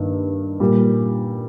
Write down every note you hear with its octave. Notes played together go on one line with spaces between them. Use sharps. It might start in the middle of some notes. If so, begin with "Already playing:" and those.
Already playing: G2 D#3 A#3 D#4
A#2 G3 A#3